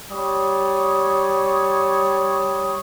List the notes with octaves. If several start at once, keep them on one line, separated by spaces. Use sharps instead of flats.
G3 C#5 D#6